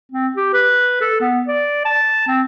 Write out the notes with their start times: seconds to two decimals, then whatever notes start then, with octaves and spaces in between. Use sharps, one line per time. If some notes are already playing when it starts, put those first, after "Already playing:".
0.12 C4
0.36 G4
0.53 B4
1.01 A4
1.21 B3
1.48 D5
1.85 A5
2.27 C4